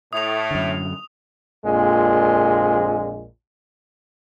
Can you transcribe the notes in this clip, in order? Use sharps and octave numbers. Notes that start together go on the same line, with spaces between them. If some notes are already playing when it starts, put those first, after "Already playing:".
A2 E5 D#6 F7
F#2 D3
A#1 F2 A#2 G#3